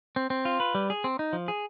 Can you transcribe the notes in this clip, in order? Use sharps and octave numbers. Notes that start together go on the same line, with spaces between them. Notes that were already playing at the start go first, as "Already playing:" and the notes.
C4
C4
F4
B4
G3
G#4
C4
D#4
F3
G#4